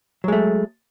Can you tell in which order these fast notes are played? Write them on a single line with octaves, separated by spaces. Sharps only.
F#3 G#3 A3